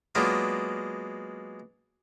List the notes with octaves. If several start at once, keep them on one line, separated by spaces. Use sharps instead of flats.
F#3 G#3 A#3 B3 D4 F4